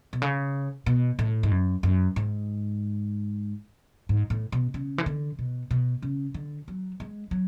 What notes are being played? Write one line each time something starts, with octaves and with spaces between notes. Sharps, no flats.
B2
C#3
B2
A2
G#2
F#2
F#2
G#2
G#2
A2
B2
C#3
E3
D3
B2
B2
C#3
D3
F#3
G#3
F#3